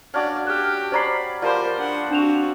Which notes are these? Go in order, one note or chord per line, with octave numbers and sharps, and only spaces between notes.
C#4 D4 F#4 D5 F5
G4 F6 F#6
C#4 C5 D5 A#5 B5 C7
F3 G4 A#4 C5 D5 B5
D4 F#5
C4 D4 F#4 E7 F7